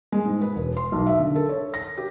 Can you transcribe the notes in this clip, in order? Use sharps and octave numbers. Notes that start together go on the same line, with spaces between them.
G#3
G#2
B4
E1
C6
B1
E5
D3
A4
C#5
A#6
G4